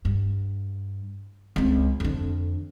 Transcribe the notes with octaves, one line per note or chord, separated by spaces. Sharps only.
G2
C#2 C4
F2 D3